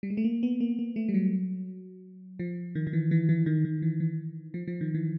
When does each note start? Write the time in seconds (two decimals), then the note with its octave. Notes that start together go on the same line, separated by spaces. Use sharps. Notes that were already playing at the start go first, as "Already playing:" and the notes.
0.03 G3
0.10 G#3
0.17 A3
0.24 A#3
0.43 B3
0.60 A#3
0.79 A#3
0.96 A3
1.09 G3
1.14 F#3
2.39 F3
2.75 D#3
2.87 D#3
2.93 E3
3.11 E3
3.29 E3
3.46 D#3
3.65 D#3
3.82 E3
4.00 E3
4.54 F3
4.68 F3
4.81 D#3
4.94 E3